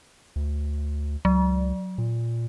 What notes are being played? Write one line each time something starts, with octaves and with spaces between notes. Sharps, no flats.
D2
C#2 F#3
A#2